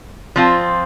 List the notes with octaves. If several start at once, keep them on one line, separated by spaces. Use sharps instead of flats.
F3 C4 F4